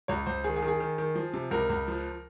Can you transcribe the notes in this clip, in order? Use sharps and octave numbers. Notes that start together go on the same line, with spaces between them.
C#2 C#5
C#2 C5
D#3 G#4
G#4
D#3
G#4
D#3
D#3
F3
C3
C#2 A#4
C#2
F3